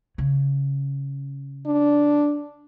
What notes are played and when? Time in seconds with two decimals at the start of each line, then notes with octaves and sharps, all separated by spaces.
0.18 C#3
1.66 D4